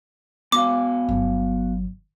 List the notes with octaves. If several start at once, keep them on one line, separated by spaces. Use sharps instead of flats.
B3 F#4 F5 D6
G1 F#3